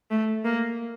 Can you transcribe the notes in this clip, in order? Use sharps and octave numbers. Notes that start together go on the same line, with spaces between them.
A3
A#3